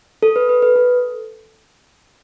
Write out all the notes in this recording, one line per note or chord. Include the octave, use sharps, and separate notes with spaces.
A4
B4
B4
B4
A4